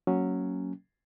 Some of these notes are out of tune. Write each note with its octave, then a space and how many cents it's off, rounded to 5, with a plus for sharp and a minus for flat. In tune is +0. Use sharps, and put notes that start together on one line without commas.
F#3 +0 A#3 -20 C#4 +0